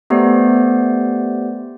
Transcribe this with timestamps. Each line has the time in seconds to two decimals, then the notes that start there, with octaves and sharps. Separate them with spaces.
0.10 A3 B3 G4 C5 D5